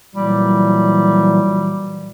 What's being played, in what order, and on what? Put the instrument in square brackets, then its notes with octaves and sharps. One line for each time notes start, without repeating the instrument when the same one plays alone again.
[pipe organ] A#2 E3 F#3 [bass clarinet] G3